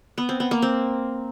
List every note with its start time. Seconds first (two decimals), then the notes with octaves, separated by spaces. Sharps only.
0.18 B3
0.29 C4
0.40 B3
0.51 A#3
0.62 C4